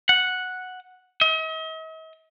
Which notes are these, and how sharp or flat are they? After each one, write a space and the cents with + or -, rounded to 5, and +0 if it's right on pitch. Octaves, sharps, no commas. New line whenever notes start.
F#5 -5
D#5 +45